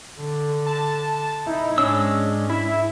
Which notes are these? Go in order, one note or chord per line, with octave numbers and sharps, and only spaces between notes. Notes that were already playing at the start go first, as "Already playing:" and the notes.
D3
A5
D#4 E4
G#2 G#3 C#4 D4 E6
E4 E5